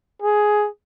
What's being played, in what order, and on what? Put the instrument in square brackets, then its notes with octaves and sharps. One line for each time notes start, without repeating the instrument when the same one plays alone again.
[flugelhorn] G#4